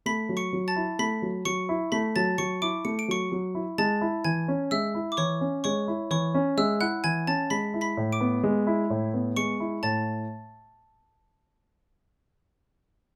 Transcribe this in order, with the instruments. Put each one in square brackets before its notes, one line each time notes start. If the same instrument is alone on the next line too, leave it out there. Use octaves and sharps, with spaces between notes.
[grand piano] A3 [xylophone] B5 B6
[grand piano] F#3
[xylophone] C#6 C#7
[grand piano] F#3
[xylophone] A5 A6
[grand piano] E4
[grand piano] A3 [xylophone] B5 B6
[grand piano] F#3
[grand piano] F#3 [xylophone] C#6 C#7
[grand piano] E4
[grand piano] A3 [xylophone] B5 B6
[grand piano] F#3 [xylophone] A5 A6
[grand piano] F#3 [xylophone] C#6 C#7
[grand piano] E4 [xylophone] D6 D7
[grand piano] A3 [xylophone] C#7
[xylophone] D7
[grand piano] F#3 [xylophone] C#6 C#7
[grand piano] F#3
E4
[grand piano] G#3 [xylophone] A5 A6
[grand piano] E4
[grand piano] E3 [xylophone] G#5 G#6
[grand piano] C#4
[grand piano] G#3 [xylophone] E5 E6
[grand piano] E4
[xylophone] D6
[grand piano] E3 [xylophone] C#5 C#6
[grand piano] C#4
[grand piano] G#3 [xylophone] C#5 C#6
[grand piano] E4
[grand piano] E3 [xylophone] C#5 C#6
[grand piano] C#4
[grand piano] G#3 [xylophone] E5 E6
[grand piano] E4 [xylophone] F#5 F#6
[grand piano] E3 [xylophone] G#5 G#6
[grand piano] C#4 [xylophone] A5 A6
[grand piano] G#3 [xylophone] B5 B6
[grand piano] E4
[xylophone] B5 B6
[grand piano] A2
[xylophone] D6 D7
[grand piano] B3
G#3
E4
A2
B3
[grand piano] G#3 [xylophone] C#6 C#7
[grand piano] E4
[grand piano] A2 [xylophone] A5 A6